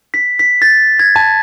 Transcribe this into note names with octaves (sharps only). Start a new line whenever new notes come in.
B6
B6
A6
G#6
A5